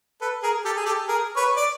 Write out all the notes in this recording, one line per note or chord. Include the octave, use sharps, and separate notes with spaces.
A4 B4
G#4 A#4
G4 A4
G#4
G4 A4
G#4 A#4
B4 C#5
D5